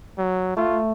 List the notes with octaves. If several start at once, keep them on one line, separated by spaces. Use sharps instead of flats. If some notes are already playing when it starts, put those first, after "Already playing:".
F#3
A3 F4